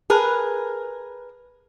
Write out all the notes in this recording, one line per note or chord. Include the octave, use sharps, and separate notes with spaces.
G#4 A#4 B4